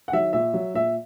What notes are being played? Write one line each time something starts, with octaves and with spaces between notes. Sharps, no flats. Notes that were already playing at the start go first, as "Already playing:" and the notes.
F#5
D#3 F#3 E5
A#2 E5
F#3
A#2 E5